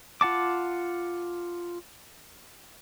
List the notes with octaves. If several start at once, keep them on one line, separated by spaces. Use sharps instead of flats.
F4 F#5 A5 D6